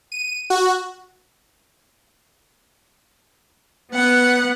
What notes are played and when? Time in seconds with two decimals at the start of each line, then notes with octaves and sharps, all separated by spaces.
0.12 D#7
0.50 F#4
3.93 B3 F#5 F#6